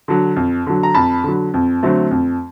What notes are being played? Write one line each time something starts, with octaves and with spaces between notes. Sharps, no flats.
D3 F#3
F2
D3 F#3
A#5
F2 A5 B5
D3 F#3
F2
D3 F#3 A3 C4
F2